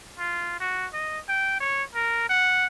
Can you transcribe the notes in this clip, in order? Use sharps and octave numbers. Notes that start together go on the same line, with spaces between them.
F4
F#4
D#5
G5
C#5
A#4
F#5